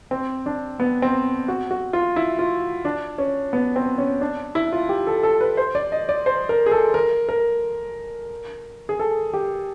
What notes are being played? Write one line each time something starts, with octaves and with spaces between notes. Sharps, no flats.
C4
D4
B3
C4
F#4
F#4
F4
E4
F4
D4
C#4
B3
C4
C#4
D4
E4
F4
G4
A4
A4
B4
C5
D5
D#5
D5
C5
A#4
G#4
A4
A#4
A#4
G#4
A4
G4